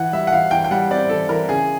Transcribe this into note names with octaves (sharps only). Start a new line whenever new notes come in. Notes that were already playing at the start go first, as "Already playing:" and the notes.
Already playing: E3 F#5
G3 E5
F#5
E3 F5
E3 G5
G5
G3 F#5
C4 D5
E3 A4
E3 A#4
C#3 G#4